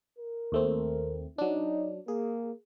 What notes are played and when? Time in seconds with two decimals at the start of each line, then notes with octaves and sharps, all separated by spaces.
0.18 A#4
0.52 D#2 A3 C4
1.38 F#3 D4 D#4
2.08 A#3 G#4